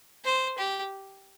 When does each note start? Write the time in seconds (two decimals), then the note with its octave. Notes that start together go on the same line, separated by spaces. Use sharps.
0.25 C5
0.58 G4